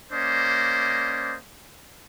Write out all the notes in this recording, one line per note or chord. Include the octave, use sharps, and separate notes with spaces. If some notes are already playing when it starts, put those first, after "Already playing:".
A#3 C#4 C5 D5 D#5